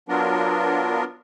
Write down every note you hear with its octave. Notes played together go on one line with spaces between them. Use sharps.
F#3 B3 D4 F4 A#4